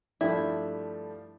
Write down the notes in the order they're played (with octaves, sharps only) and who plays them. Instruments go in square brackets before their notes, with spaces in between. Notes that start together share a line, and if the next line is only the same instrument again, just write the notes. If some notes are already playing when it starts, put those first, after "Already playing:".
[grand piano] G2 F3 A3 D4 G4 [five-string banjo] E4